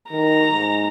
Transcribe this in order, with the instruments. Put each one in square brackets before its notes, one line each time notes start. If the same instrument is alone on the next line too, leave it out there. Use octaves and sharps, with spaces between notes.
[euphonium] D#3 [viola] A#5
[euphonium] G#2